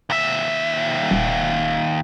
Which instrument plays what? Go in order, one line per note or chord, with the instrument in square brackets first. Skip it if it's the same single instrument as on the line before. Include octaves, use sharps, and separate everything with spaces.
[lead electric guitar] D#2 E5
[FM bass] D#1